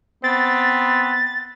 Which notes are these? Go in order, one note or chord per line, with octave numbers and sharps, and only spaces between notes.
B3 C4 A6